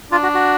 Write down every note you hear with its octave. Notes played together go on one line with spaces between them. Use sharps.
D4 F4
F#4
F#4